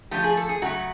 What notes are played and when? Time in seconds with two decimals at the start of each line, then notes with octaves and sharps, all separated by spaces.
0.11 D3 F3 A3 G4
0.24 G#4
0.37 A4
0.49 G#4
0.62 C#3 F#3 A3 F#4